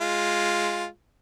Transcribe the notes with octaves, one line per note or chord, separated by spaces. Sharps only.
G#3 F4